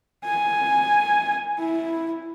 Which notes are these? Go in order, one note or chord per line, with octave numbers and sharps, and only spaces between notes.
G#5
E4